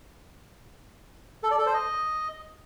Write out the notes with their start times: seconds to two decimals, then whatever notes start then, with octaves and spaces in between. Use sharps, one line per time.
1.43 A4
1.51 D5
1.59 A4
1.66 C5
1.74 D#5